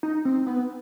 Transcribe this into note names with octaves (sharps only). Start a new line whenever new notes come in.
D#4
C4
B3